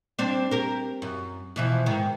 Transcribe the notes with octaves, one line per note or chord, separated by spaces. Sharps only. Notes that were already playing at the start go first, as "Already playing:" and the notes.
G3 C4 D4
G4 A#4
F#2
B2 E3 F3
G#2 D#3